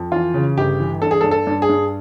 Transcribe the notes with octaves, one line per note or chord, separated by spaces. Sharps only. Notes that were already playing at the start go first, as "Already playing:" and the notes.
Already playing: F2
E3 F4
C#3
G1 G4
E3
G2 A4
G#4
A4
G2
A4
G2
G#4
G2